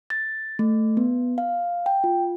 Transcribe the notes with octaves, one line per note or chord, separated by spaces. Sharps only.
A6
A3
B3
F5
G5
F4